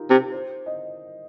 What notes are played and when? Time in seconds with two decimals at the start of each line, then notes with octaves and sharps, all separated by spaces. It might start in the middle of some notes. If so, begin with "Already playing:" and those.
Already playing: D#4 F4 G4 A#4
0.10 C3
0.32 C5
0.66 D#5